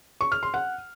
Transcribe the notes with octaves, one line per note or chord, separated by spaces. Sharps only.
C#6
F6
C6
F#5